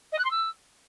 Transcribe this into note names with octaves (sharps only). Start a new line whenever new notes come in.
D#5
F#6
C6
E6